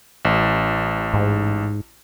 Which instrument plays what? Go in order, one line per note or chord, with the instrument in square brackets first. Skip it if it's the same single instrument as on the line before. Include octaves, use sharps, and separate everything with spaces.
[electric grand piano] A1
[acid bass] G#2